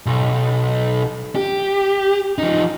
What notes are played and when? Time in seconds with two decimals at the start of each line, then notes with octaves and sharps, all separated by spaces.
0.06 B1
1.35 G4
2.38 F3 D#4